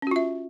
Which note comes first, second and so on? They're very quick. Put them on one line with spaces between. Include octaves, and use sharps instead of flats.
C#4 F#4 F4 E5